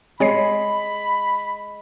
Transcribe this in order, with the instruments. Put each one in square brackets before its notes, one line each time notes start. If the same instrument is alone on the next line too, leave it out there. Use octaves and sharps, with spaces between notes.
[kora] G#3 [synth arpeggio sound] C4 C#5 C7 [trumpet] B5